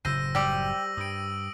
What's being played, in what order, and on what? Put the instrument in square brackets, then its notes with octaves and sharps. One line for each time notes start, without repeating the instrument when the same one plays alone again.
[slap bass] F#1 A2 C#3 [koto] C5 [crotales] E6 A#6 D#7
[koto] G3 G4 [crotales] E6 F#7
[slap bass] G2 [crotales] D#6 D7